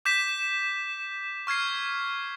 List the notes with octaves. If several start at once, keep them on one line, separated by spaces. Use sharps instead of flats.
D6 G6 B6 E7
C#6 F6 G#6 C7